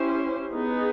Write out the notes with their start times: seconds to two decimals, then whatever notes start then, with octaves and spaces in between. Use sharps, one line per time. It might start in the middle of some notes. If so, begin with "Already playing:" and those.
Already playing: C#4 E4 G4 C5
0.53 B3 D#4 G#4